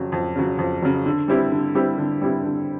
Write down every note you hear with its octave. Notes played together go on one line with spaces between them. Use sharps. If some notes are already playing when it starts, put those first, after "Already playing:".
Already playing: F2 C#3 F#3
F2
C#3 F#3
F2
C#3 F#3
D3
G3 C4 E4 G4
D3
G3 C4 E4 G4
D3
G3 C4 E4 G4
D3